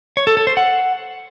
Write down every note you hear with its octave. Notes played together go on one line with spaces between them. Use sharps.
C#5
A4
A4
C5
F#5